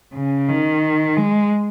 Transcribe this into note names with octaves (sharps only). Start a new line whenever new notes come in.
C#3
D#3
G#3